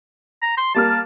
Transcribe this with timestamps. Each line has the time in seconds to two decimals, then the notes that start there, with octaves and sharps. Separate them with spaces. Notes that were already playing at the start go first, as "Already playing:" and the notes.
0.42 A#5
0.57 C6
0.74 G3 A#3 A5 F6